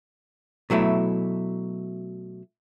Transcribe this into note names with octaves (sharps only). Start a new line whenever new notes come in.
B2 F#3 A3 E4